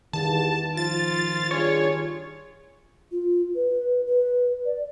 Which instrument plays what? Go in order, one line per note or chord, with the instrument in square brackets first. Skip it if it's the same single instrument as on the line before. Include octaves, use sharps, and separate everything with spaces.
[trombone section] E2 G2 [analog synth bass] D#3 [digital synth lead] A5
[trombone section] F3 [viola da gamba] F4 [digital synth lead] A6
[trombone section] G2 D4 G#4 [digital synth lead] C#5
[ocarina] F4
B4
B4
D5